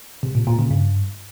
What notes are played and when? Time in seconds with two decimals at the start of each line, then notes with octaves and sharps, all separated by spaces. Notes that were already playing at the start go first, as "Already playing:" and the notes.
0.23 C3
0.35 A#2
0.47 A#2
0.59 C#3
0.71 G2